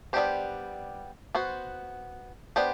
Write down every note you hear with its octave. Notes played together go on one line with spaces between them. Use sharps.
G3 B3 D4 G4 C5
B3 F#4 C5
B3 D4 G4 C5